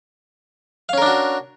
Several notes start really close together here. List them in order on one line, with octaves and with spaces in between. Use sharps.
F5 C#4 A#4 D4 F#4